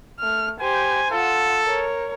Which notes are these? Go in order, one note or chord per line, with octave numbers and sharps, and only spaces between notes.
A3 F6
G4 C5 G#5
F4 A4 F#5
A#4 C#5